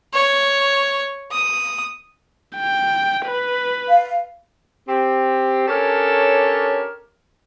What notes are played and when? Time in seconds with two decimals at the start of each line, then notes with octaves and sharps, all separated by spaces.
0.13 C#5
1.31 D#6
2.57 G5
3.26 B4
3.89 F5
4.88 C4 G4
5.68 C#4 D4 G4 A4 A#4 C#5